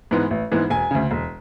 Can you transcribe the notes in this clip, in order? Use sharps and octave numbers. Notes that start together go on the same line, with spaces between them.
G#2 E3 G#3 B3
A1
G#2 E3 G#3 B3
E1 G#5
D2 C#3
E1